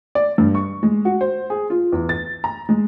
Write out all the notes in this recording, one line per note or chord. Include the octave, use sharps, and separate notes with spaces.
D5
G2
C#6
G#3
F#4
C5
G#4
F4
E2
A6
A#5
G#3